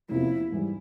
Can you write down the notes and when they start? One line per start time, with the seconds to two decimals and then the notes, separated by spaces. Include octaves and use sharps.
0.09 E2 C3 F3 A#3 C#4 E4
0.52 G#2 E3 G3